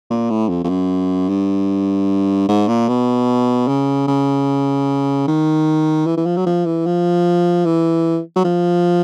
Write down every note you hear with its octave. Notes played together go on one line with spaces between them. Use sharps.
A#2
A2
F2
F2
F#2
G2
G#2
A#2
B2
C#3
C#3
D#3
E3
E3
F3
F#3
F3
E3
F3
E3
F#3
F3